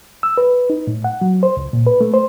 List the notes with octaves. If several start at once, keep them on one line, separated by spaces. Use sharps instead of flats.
E6
B4
D#4
A2
F#5
F#3
C5
C#2
A#2
B4
A3
C5